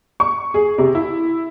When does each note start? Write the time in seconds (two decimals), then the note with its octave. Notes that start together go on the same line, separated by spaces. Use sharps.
0.20 C#6
0.54 G#4
0.78 C3
0.95 E4